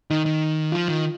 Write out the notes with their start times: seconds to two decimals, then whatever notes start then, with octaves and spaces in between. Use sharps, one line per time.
0.11 D#3 D#4
0.26 D#3
0.72 F3 F4
0.88 D#3